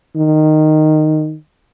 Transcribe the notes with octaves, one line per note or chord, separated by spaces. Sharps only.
D#3